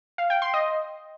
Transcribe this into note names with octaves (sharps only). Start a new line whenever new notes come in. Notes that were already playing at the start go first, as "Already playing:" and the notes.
F5
G5
C6
D#5